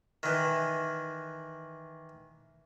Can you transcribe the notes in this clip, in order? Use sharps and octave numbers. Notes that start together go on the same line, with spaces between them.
D#3 E3